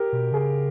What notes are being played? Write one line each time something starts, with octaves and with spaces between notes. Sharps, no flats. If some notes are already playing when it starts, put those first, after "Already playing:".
Already playing: G4 A#4
B2
C#3 G#4